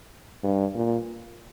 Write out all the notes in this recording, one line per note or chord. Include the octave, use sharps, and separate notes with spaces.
G2
A#2